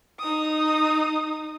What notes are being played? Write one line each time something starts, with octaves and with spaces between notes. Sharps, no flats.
D#4 D#6